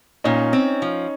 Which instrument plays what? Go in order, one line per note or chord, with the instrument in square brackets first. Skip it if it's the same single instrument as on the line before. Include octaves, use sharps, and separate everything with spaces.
[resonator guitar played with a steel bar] A#2 [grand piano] C#4 D#4
[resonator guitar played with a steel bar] C4
F3